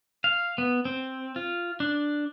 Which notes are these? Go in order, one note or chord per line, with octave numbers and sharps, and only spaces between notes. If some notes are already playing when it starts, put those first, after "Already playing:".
F5
B3
C4
F4
D4